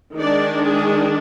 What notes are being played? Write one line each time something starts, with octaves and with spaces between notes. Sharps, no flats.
D#3 G#3 D4 D5
G#4